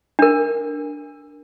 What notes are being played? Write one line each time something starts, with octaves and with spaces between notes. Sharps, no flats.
D4 A#4